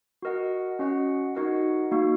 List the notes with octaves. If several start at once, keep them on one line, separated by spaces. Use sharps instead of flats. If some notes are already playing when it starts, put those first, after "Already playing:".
F#4 A#4 D#5 F#5
C#4 F#4 D#5 F#5
D#4 F#4 A#4 D#5 F#5
A#3 D#4 F#4